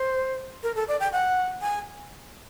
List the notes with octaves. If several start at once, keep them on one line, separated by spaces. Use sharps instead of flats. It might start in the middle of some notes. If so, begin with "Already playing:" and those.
Already playing: C5
A#4
A4
D5
G5
F#5
G#5